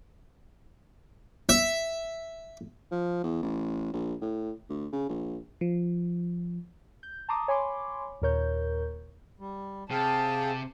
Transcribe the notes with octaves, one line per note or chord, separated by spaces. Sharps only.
E5
F3
E2
A1
A#1
A2
D2
C#3
A#1
F3
G6
A5 A#5 C6 D6 D#6
C#5 G#5 B5 C6 D6
D#2 A#2 A#4 C#5 G6
G3
C3 G#4 F5 G5 A5